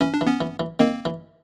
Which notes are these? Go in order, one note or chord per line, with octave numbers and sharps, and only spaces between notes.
E3 C#4
D4
E3
B3 C#4
E3
E3
D#3 A#3 C4
E3